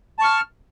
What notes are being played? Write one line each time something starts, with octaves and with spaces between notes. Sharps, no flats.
A5 C#6 F6